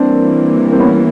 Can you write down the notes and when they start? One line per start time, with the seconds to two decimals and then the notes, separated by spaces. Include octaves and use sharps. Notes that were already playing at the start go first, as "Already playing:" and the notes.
Already playing: E3 G3 A#3 C4 D4
0.72 C4
0.80 B3 C#4